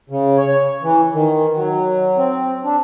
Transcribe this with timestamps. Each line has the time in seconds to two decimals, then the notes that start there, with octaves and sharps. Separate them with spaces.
0.10 C#3
0.37 C#5
0.82 E3
1.13 D#3
1.55 F#3
2.17 C4
2.64 D4